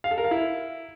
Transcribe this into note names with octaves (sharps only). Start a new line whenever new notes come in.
F5
A4
A#4
F5
E4